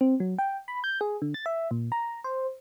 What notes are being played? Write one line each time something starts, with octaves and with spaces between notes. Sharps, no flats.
C4
F#3
G5
B5
G6
G#4
D3
A6
E5
A#2
A#5
C5